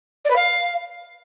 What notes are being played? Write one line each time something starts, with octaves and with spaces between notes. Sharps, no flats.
D5
B4
F5